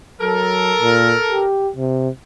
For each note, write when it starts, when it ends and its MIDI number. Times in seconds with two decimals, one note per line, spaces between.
0.21 0.75 54
0.21 1.44 69
0.21 1.44 70
0.81 1.15 46
1.30 1.71 67
1.76 2.09 48